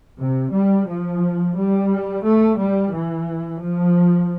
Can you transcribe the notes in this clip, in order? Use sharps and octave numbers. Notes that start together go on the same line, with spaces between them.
C3
G3
F3
G3
A3
G3
E3
F3